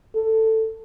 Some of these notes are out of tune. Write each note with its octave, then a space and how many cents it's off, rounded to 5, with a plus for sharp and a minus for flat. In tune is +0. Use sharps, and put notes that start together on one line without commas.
A4 +10